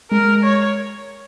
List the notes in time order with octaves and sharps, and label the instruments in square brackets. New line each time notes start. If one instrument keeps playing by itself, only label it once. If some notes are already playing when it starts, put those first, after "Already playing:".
[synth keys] G#3 [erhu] A#4
[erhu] C#5